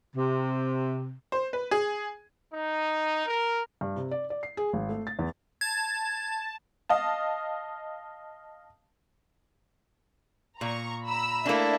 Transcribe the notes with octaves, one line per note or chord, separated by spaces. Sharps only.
C3
C5
B4
G#4
D#4
A#4
G2
C3
D5
D5
C7
G#4
G#1
A3
A6
E2
A5 G#6
D#5 F5 A5
A#2 A#5 C#6
A#5 B5 E6
A3 A#3 D4 E4 E5